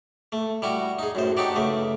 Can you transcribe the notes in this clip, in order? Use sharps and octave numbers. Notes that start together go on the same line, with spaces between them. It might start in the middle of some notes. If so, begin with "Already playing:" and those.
A3
G3 E4 F#4
D#4 G#4
F#2 A2 C5
D4 D#4 F#4 G4 D5
C#3 A3 B4